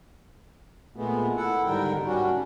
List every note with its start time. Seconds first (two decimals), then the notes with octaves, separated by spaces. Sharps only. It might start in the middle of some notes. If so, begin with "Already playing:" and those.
0.96 A#2 G#3 A3 B3
1.37 E4 A4 F#5
1.66 G#2 D3 D#3 G3 A#4 G5
2.05 G3 C#4 D4 F#4